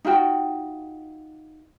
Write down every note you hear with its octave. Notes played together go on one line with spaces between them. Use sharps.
D#4 F4 F#4 G5